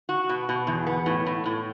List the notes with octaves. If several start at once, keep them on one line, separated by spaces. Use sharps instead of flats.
F#4
B2
B2
E2
B3
A2
A2
A2